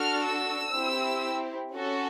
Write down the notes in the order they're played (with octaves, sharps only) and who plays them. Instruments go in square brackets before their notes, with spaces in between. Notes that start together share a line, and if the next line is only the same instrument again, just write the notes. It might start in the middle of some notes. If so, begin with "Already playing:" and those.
Already playing: [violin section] D4 F#4 A4 F6
E6
C4 E4 G4
C#4 F#4 A4